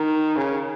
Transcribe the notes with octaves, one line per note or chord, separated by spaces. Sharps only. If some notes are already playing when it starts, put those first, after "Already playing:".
Already playing: D#3
C#3